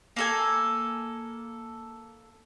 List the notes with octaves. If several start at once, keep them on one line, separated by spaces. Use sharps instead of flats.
A#3 A4 G#5